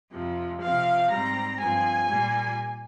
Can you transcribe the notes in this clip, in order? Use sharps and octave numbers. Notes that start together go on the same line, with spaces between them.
F2 C3 F3
C3 F3 C4 F5
G#2 G3 C4 A#5
G2 F3 C4 G#5
A#2 G3 A#3